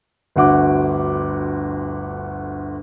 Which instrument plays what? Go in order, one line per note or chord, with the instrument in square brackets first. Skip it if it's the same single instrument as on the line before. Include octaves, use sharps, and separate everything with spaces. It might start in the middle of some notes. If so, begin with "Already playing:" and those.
[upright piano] G1 D2 F#4 D6